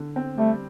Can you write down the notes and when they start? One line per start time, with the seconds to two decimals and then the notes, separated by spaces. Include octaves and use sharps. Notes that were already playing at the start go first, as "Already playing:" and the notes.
Already playing: D3
0.16 C4
0.38 G3 A3